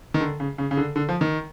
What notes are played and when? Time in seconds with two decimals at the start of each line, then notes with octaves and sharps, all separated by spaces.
0.14 D#3
0.21 D3
0.40 C#3
0.58 C#3
0.71 C#3
0.77 D3
0.96 D3
1.09 F3
1.21 D#3